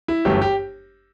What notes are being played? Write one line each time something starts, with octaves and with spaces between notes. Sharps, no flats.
E4
G1 F#2 E3 A3 G4
G4